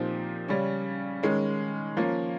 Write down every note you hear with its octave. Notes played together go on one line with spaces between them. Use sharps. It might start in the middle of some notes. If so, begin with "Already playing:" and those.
Already playing: A#2 F3 C4 D#4 G4
C#3 G3 C#4
D#3 G#3 C#4
F3 A#3 C#4